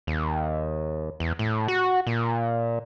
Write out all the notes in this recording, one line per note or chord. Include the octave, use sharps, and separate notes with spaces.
D#2
E2
A2
F#4
A#2